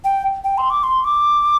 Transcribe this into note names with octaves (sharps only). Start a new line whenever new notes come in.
G5
G5
C6
D6
C6
D6